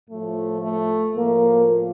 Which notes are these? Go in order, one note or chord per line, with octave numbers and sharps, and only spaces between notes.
A2 F3 A3
A3
A2 F3 A#3